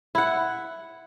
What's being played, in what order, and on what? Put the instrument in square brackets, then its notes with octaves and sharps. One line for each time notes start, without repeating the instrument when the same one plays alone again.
[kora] E4 F#5